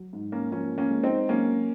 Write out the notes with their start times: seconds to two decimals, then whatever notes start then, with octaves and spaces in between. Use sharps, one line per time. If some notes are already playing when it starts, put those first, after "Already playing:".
Already playing: F#3
0.13 G#2
0.32 A#3 C#4
0.51 F3 A#3 C#4
0.78 A#3 C#4
0.90 G#3
1.04 C4 D#4
1.29 F#3 A#3 C#4